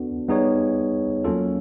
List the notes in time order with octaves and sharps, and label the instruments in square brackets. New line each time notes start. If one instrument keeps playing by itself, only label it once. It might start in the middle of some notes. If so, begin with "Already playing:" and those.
Already playing: [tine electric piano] B3 D4 F#4 A4
G3 B3 D#4 G#4 C#5
F#3 A#3 C#4 F4 A4